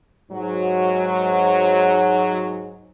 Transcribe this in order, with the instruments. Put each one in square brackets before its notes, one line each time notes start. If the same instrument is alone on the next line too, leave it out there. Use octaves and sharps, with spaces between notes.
[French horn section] G#2 F#3